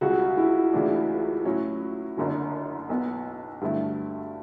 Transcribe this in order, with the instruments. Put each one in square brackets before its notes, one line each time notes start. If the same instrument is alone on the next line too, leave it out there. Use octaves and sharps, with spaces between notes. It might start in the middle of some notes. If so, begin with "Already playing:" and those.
[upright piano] C#2 C#3 G3 [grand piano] F#4
[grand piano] E4
[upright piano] C#2 C#3 E3 A3 D4
A2 F#3 C#4
F#1 F#2 D3 F#3
B1 B2 F#3 B3
G2 D3 F#3 A3 E4